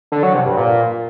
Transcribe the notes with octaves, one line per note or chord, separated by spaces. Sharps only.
D3
F#3
C3
G2
A#2